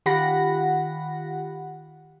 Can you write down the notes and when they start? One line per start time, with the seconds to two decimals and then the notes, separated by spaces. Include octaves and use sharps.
0.06 D#3 F4 G4 F#5 B5 A#6